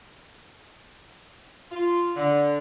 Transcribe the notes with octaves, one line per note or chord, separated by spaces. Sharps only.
F4
D3